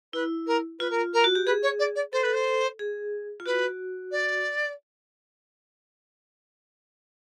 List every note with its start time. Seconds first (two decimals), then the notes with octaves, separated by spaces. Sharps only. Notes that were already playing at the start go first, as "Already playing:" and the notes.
0.13 E4 B4
0.47 A#4
0.79 F4 B4
0.90 A#4
1.13 A#4
1.24 F#4
1.35 G4
1.46 G#4 B4
1.63 C#5
1.79 D5
1.96 D5
2.13 A4 C5
2.23 B4
2.33 C5
2.79 G#4
3.40 F4
3.46 F#4 B4
4.11 D5